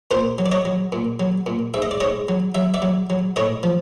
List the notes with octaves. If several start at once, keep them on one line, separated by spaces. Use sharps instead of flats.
A#2 A#4 C5
F#3
D5
C#5 D#5
F#3
A#2
F#3
A#2
G#2 E5
D#5
D5
G#2 C#5 D#5
F#3
F#3 E5
D5 E5
F#3
F#3
A2 C#5 D#5
F3